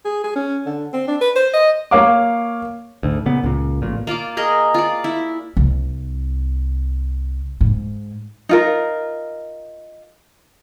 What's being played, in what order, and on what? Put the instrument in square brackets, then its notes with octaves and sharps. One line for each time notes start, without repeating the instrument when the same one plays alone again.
[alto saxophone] G#4
G#4
C#4
D3
C4
D4
B4
C5
D#5
[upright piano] A#3 C#5 F5 D6
[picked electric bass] D2 G#2
A#2 C#3 B3
C#2 A#2
A1 A#2
[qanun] A#3 F4 D5 D6
G#4 A#4 D#5
F4 D5
E4
[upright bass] C2
G#2
[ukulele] D#4 F4 A#4